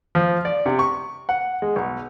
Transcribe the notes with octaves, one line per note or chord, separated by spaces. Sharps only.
F3
D5
C3
C#6
F#5
G#3
B1